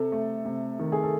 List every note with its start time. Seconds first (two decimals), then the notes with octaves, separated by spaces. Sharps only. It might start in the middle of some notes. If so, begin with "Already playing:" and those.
Already playing: C3 A4
0.12 A3
0.45 C3
0.79 D#3
0.92 G#4
1.03 A4